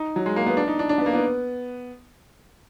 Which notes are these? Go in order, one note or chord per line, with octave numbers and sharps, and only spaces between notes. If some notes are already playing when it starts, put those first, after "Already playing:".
Already playing: D#4
F#3
G#3
A#3
B3
D4
D#4
D4
D4
B3
A#3
B3